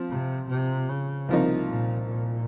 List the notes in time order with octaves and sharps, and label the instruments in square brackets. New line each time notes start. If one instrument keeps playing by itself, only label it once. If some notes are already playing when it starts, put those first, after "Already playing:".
Already playing: [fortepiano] F3 C4
[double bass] C3
C3
C#3
[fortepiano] C2 C3 F3 A#3 D#4
[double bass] A#2
A#2